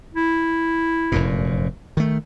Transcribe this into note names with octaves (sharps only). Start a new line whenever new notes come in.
E4
F1 F#2 A#2
D#3 A3